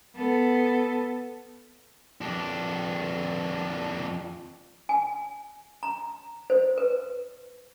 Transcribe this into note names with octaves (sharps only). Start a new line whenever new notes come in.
B3 A4
F2 D4
G#5
A#5
C5
B4